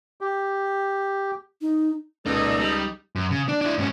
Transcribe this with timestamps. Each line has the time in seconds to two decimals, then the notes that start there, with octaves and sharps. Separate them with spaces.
0.21 G4
1.61 D#4
2.26 C#2 A#3 D#4 A4 D5 D#5
2.60 G3
3.16 F#2
3.31 C#3
3.48 D4
3.61 D4 E4
3.78 G#2 C#4